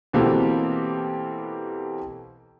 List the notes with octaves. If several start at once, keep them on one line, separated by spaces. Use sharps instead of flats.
B2 E3 A#3 C4 G4 A4